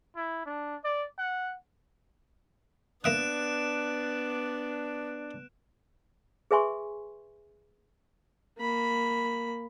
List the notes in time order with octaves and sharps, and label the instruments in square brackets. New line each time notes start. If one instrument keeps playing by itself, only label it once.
[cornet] E4
D4
D5
F#5
[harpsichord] A#3 E5 D#6 [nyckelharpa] B3 [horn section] D4 [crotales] F#6 D7 E7
[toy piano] G#4 B4 E5 G#5 C6 C#6
[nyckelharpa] A#3 B5